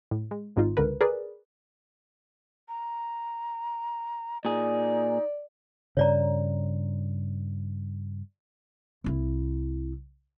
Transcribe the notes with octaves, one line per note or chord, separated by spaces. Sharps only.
A2
G#3
G#1 G#2 D#4 F4
C#2 D3 A#4 B4
G#4 A#4 B4 D5
A#5
A#2 D#4 G#4 D5
G2 C#3 C#5 D5 A#5
C2 E4